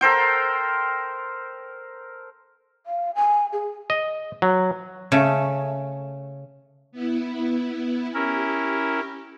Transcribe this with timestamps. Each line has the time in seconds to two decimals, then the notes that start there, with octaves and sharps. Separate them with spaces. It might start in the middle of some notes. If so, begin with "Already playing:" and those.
0.01 A4 A#4 C5 G5
2.86 F5
3.15 G#5
3.53 G#4
3.90 D#5
4.42 F#3
5.12 C#3 A3
6.92 B3 E4
8.14 C#4 E4 G4 A#4